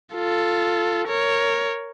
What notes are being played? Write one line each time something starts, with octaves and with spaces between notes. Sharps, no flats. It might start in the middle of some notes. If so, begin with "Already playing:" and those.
F4 A4
A#4 C#5